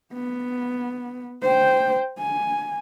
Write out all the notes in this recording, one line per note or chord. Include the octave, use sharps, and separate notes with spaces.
B3
C5 G5
G#5